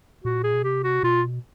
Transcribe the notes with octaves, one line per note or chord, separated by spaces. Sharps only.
A#2 F#4
G#4
B2
C3 G4
F#4
B2 F4